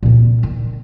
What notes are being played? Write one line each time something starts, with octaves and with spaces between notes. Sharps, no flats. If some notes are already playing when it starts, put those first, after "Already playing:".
A#2 C4
D#3